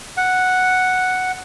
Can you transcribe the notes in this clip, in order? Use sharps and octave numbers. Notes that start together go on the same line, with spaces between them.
F#5